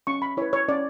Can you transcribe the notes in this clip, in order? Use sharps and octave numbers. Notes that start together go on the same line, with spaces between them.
C#4 C#6
B5
E4 B4 C#5
C#5
C#4 D5